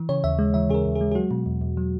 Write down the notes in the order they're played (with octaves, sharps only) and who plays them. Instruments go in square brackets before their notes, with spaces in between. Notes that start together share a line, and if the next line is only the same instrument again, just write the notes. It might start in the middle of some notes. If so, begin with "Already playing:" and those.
Already playing: [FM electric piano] E3
C#3 C#5
D#2 E5
G#3
E3 E5
C#3 G#4
A#4
D#2
G#4
G#3
G#4
F#3 F#4
B2
E2
E2
F#3